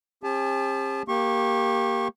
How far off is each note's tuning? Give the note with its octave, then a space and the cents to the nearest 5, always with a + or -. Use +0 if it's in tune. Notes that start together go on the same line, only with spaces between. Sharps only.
C4 +45 G4 +45 A5 -25
A#3 +0 G4 +0 C#6 -30